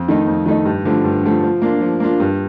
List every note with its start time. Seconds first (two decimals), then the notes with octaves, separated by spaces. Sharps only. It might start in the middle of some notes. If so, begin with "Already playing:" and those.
Already playing: F2
0.08 D#3 A3 D#4
0.28 F2
0.46 D#3 A3 D#4
0.65 G2
0.85 D3 F3 A3
1.04 G2
1.23 D3 F3 A3
1.43 F3
1.62 A#3 D4 F4
1.81 F3
2.00 A#3 D4 F4
2.20 G2